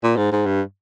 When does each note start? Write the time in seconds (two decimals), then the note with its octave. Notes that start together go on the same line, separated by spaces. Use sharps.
0.03 A#2
0.17 G#2
0.32 G#2
0.46 G2